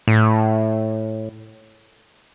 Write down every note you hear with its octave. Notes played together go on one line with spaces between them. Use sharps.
A2